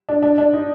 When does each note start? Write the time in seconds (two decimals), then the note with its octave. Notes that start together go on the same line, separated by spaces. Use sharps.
0.09 D4
0.23 D4
0.38 D4
0.53 D#4